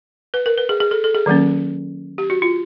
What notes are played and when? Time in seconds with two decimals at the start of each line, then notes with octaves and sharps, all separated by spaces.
0.34 B4
0.46 A#4
0.58 B4
0.69 G#4
0.80 G#4
0.91 A4
1.04 A4
1.14 G#4
1.26 D#3 F#3 A#3 C#4
2.18 G4
2.30 F#4
2.42 F4